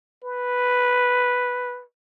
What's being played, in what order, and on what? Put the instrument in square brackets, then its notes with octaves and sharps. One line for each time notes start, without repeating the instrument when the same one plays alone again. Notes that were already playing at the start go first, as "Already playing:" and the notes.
[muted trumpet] B4